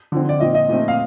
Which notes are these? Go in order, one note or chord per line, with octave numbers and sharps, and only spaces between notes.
D3 F3 C4
D5
A#2 F3 C4 D#5
D#5
A#2 F3 A3 C4
F5